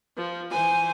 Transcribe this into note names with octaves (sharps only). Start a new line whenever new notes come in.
F3
E3 C5 G#5